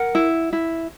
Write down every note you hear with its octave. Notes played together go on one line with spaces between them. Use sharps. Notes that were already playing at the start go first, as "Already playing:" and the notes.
Already playing: A#4 F#5
E4
E4